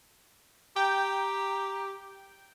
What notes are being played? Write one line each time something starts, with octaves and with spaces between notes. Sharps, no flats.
G4 G5 A#5